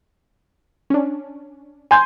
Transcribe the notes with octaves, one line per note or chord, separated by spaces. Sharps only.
C#4 D4
G#5 C6 G6